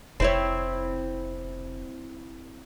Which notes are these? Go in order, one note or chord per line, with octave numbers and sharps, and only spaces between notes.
F1 C4 E4 C#5